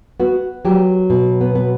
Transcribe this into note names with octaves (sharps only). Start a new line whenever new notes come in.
B3 F#4
F#3 G4
B2
B3
B3